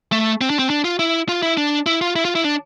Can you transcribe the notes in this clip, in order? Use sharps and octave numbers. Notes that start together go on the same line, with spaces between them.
A3
C4
D4
C4
D4
F4
E4
F4
E4
D4
E4
F4
E4
F4
E4
D4